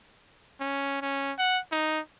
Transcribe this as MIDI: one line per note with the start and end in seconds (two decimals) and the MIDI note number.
0.61 1.00 61
1.02 1.32 61
1.39 1.59 78
1.72 2.00 63